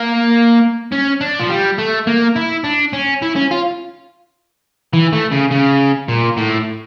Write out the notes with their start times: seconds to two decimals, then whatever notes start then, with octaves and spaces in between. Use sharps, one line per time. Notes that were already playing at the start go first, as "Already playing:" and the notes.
Already playing: A#3
0.92 C#4
1.21 D4
1.39 F3
1.49 G3
1.78 A3
2.07 A#3
2.36 E4
2.64 D4
2.93 C#4
3.22 E4
3.36 C#4
3.51 F4
4.93 E3
5.13 A3
5.32 C#3
5.51 C#3
6.08 A#2
6.37 A2